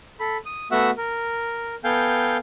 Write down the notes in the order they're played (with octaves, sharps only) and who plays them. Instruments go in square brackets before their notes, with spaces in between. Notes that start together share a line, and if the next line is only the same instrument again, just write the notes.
[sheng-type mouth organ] A4 B5
D#6
A3 B3 F#4 E5 F#5 E6
A#4
B3 A4 F5 G5 G#5 G6